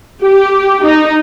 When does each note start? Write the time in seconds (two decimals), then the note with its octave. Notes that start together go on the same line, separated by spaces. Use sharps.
0.22 G4
0.85 D#4